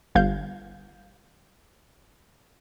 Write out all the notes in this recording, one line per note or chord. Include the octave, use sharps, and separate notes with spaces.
G1 F5 G6